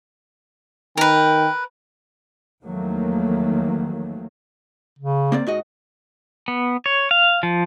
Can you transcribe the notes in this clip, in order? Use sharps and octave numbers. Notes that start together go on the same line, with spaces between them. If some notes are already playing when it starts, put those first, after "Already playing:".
D#3 A#4 B4 G5
E2 D#3 F3 F#3 A3 A#3
C#3
A#3 C4 D5
G#2 F#4 D#5
B3
C#5
F5
F3